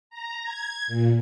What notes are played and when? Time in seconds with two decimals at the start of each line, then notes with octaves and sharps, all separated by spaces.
0.10 A#5
0.44 G#6
0.88 A#2